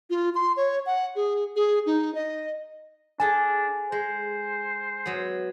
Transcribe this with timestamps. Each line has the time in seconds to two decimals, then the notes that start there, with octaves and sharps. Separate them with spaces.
0.10 F4
0.35 C6
0.57 C#5
0.86 F#5
1.16 G#4
1.56 G#4
1.86 D#4
2.15 D#5
3.20 D4 G#4 A4 G#5 A5
3.92 G#3 C5
5.06 F#3 B3